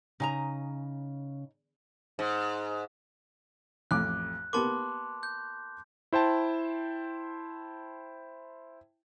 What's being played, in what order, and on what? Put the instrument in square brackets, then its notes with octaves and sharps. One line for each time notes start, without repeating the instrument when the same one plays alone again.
[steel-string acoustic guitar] C#3 [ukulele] D#4 G#5 A#5
[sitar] G#2
[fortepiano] A1 F2 D6 [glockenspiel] F#6
[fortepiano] A#3 B3 G4 [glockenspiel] A5 C6 D6
[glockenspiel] G6
[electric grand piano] E4 C5 G5 A5